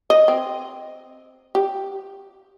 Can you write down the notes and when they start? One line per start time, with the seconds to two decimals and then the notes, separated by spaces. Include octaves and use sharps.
0.10 D#5
0.28 C4
1.55 G4